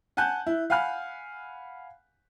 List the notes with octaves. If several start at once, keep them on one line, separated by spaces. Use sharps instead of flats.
F#5 G#5 A5 F#6 G6
E4
F5 F#5 G#5 B5 F6